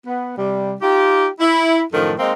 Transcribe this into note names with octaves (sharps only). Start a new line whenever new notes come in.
B3
C3 G3
D#4 F4 G4
E4
F#2 A2 D#3 F3 A4
G#3 A#3 C4 D#4